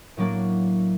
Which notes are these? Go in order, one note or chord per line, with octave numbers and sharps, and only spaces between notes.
A2 F#3 A#3 D4